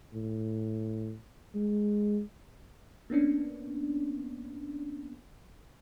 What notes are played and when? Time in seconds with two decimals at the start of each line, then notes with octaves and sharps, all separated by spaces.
0.13 A2
1.55 G#3
3.10 A#3 B3 C#4 D4